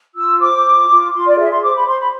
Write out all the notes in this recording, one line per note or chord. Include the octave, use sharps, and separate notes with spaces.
F4 E6
C5 D6
F4
F4
F4 C6
D5
G#4 E5
C6
C5 D6
B5
C5 C6
B5